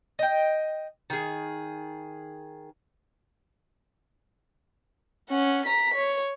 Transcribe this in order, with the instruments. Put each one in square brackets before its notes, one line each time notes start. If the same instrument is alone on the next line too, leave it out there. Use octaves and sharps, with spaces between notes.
[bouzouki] D#5 G5
D#3 G#4
[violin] C#4 F#5
A#5 B6
C#5